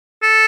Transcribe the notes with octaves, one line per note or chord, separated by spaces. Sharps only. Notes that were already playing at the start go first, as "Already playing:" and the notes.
A4